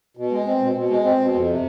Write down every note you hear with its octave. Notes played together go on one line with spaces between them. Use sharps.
B2
G#3
C4
B2
B2
G#3
C4
B2
F2
C3